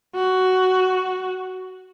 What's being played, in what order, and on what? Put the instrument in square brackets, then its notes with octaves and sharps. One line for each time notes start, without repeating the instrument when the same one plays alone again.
[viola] F#4